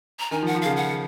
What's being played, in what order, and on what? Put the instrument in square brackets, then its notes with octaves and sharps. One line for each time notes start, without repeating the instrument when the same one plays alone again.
[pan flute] A#5
[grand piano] D#3 [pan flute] G#5
[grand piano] F3
[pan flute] F#5
[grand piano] F3
[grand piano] C#3 [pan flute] F5
[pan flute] F#5